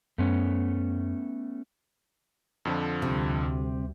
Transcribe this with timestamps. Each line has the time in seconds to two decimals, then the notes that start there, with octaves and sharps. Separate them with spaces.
0.18 F#2 A3 B3 C#4
2.65 F2 D3 F3
3.02 D2 C3 G3